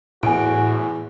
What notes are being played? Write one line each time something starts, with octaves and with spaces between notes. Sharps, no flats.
E2 A2 F#4 G#5 D7